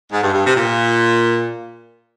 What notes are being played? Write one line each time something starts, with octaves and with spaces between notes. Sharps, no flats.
G#2
G2
G2
C3
A#2